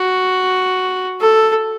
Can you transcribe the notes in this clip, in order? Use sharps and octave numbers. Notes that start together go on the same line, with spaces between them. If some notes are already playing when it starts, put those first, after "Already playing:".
Already playing: F#4
A4